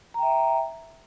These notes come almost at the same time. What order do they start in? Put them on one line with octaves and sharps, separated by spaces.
A#5 G5 E5